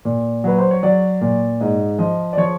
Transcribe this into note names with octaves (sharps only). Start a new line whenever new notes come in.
A#2
F#3 B4
C5
C#5
F#3 D5
A#2
G#2 D#5
F3 D#5
D5
F3 C#5